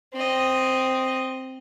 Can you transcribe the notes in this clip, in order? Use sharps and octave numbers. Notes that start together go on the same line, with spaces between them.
C4 D#5